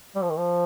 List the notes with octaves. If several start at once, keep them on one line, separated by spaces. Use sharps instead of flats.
G3
F3
D#3
F3